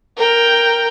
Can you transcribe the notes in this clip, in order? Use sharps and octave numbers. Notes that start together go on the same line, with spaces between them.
A#4 G5